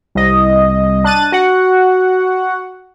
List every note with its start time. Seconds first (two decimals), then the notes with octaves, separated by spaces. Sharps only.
0.15 C2 D#5
1.04 D4 F#6 A6 D#7
1.32 F#4 F#5